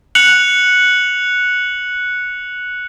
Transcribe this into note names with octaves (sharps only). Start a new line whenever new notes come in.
F#6 C#7 F7 F#7